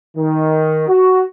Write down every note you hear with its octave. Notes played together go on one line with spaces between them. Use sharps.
D#3
F#4